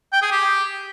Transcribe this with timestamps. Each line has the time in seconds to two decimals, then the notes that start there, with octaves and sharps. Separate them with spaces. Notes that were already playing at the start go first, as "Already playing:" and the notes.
0.13 G5
0.22 G#4
0.31 G4